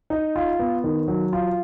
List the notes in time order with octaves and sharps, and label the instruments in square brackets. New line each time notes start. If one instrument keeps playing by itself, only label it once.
[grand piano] D#4
F4
B3
D#3
F#3
F4